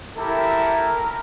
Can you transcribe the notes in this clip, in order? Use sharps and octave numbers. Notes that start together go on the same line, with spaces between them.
E4 G4 A4 A#4